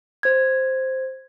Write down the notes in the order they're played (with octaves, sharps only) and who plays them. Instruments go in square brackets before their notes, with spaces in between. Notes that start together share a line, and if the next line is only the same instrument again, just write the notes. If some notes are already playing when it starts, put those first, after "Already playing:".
[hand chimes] C5 G#6